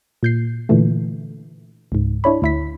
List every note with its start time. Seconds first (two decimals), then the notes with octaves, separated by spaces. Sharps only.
0.23 A#2 G6 C7
0.69 A#2 D3 E3 A3
1.92 C#2 G#2
2.24 D4 E4 C#5 B5
2.42 D2 E4 B6